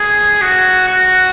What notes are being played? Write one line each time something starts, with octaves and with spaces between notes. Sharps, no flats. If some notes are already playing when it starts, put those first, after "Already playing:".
Already playing: G#4
F#4
F#4